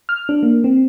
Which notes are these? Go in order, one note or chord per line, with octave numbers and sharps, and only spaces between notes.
F6
D4
A#3
C4